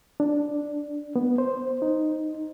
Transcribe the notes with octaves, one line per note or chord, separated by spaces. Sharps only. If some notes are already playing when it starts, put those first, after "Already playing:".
D4
B3
C5
D#4